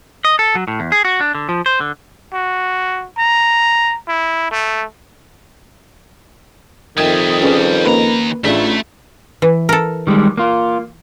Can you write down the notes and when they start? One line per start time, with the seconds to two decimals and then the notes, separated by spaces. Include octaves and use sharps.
0.25 D#5
0.39 A4
0.55 F#3
0.68 A2
0.80 E2
0.92 G#4
1.05 F#4
1.21 D4
1.35 D3
1.49 F3
1.66 C5
1.80 D3
2.33 F#4
3.19 A#5
4.08 E4
4.51 A3
6.98 F2 D#3 G3 E5 G5 D#6 G#6
7.41 C#4 G#4 B4
7.85 D#2 A#3 C#4 B4 A#5
8.44 A1 A3 D4 F4 G#4 E5
9.42 E3
9.69 A4 A#4
10.07 D#3 G3 G#3
10.37 A#3 F4